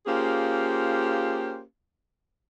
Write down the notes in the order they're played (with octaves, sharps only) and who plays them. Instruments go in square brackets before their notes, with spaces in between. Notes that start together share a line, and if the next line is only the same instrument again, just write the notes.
[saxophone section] A#3 C#4 F4 G4 G#4 C5